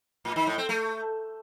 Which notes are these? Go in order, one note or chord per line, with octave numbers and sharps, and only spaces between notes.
A2
D#3
A2
C4
A3